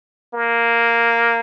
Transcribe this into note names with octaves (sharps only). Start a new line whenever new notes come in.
A#3